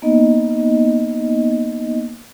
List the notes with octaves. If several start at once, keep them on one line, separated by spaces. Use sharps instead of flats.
A#3 B3 D#4 D#5